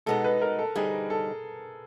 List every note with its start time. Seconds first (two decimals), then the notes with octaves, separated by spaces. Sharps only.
0.06 B2 G#3 B3 D#4 A4
0.24 B4
0.42 A#4
0.59 A4
0.75 D3 G3 C4 D#4 G#4
1.10 A4